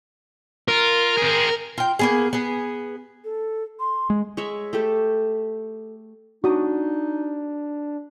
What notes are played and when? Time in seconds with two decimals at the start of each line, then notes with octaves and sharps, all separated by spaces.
0.68 F4 A#4
1.17 C4 G#4
1.78 F4 G5
1.99 A#3 B3 G#4
2.33 B3 G#4
3.24 A4
3.80 C6
4.10 G#3
4.37 G#3 C#5 E5 C#6
4.73 A3 G4 A4
6.44 D4 D#4 F#4 D#6